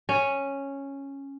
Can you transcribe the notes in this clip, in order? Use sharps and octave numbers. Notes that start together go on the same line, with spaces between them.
C#4